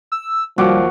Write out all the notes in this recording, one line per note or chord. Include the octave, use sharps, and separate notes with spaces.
E6
D#2 F3 G3 F#4 D6